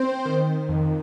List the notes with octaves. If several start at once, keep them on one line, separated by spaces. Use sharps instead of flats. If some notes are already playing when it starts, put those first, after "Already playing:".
Already playing: C4 C5
D#3
F2